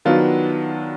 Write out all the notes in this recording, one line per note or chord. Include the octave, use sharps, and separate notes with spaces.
D#3 F#3 B3 D4 F4